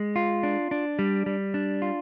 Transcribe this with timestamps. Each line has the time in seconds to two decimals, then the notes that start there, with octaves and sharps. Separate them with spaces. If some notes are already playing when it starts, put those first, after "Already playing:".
Already playing: G#3
0.16 F4
0.43 D4
0.71 D4
0.99 G3
1.26 G3
1.54 D4
1.82 F4